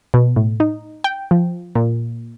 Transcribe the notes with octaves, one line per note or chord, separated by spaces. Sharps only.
B2
A2
D#4
G5
F3
A#2